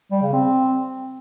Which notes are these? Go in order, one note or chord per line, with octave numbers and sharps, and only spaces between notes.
G3
C#3
C4